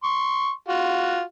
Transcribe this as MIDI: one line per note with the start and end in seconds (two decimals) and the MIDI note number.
0.04 0.51 84
0.04 0.51 85
0.69 1.21 65
0.69 1.21 66